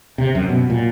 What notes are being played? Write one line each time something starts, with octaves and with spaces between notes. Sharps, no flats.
C3
F#2
B2
A#2